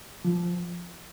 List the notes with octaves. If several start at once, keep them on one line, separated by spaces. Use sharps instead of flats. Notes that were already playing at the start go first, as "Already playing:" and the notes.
F3